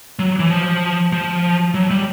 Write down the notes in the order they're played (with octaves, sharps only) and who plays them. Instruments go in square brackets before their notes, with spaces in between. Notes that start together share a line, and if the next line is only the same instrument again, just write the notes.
[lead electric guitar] F#3
E3
F3
F3
F#3
G3